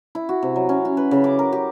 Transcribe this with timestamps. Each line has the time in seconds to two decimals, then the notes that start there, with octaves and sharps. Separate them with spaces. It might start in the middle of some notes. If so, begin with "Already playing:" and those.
0.15 E4
0.29 F#4
0.42 C3
0.56 F#3
0.69 C#4
0.85 F#4
0.97 B4
1.11 C#3
1.24 D6
1.39 A#4
1.53 G4